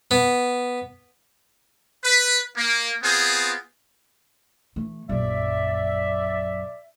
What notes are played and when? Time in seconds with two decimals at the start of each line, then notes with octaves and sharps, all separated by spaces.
0.11 B3
2.04 B4
2.57 A#3
3.03 B3 C4 F4 G#4
4.76 E3 A3
5.09 A#1 F#2 D5 E5